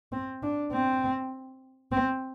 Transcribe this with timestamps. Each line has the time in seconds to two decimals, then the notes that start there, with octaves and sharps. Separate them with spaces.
0.12 C4
0.42 D4
0.72 C4
1.92 C4